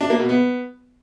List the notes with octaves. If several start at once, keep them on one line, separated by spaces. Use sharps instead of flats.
D4
A#3
B2
B3